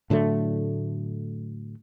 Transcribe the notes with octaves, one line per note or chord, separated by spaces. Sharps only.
A2 D3 F#3 A3